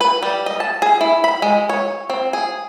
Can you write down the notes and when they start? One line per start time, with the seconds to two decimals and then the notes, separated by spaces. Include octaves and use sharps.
0.01 B4
0.23 G3
0.46 D#5
0.60 A5
0.82 G#4
1.01 E4
1.24 B5
1.42 G#3
1.69 C#5
2.10 C4
2.33 G#4